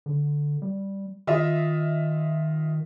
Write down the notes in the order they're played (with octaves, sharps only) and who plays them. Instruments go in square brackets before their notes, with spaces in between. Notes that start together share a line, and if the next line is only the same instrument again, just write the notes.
[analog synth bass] D3
G3
[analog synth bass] D#3 [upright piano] F4 D#5 E5